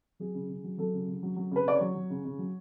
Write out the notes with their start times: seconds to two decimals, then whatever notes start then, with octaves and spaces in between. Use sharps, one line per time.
0.20 F#3 G#4
0.34 C#3
0.49 C#3
0.64 F#3
0.78 F#3 A4
0.93 C#3
1.08 C#3
1.23 F#3
1.36 F#3
1.51 C#3 B4
1.66 C#3 D5
1.76 F#3 C#5
1.95 F#3
2.10 C#3
2.25 C#3
2.38 F#3